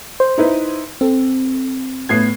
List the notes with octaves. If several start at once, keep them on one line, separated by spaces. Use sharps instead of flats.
C5
D#4 E4 B4
C4 A4
A2 B3 G#6 C7